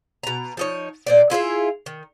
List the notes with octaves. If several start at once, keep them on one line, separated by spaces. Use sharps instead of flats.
B2 A#5
F3 D#4 C#5
A#2 C5 D5
E4 F4 G#4 E5
D#3